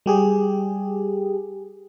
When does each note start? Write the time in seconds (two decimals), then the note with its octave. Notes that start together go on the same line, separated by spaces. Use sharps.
0.06 G3 G4 G#4